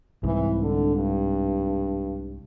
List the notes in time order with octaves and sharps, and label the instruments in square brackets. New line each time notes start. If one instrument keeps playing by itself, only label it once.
[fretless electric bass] C2 G#2 [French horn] E3
[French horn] D3
G2